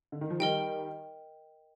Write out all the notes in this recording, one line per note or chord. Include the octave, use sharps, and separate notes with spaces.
D3
D#3
F3
D#3 G3 A#4 D#5 G5